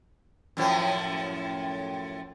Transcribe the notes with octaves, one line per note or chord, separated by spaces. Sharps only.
F#2 A2 F3